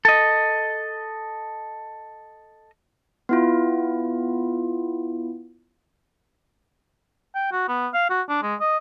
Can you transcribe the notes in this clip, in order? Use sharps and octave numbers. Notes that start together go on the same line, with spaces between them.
A4 D#5
B3 E4 F4
G5
F#4
B3
F5
F#4
D4
G#3
D#5